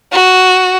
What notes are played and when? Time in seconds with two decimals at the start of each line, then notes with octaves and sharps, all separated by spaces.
0.13 F#4